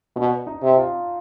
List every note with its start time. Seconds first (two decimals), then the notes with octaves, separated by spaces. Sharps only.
0.16 B2 D4
0.47 D#4
0.62 C3
0.78 F4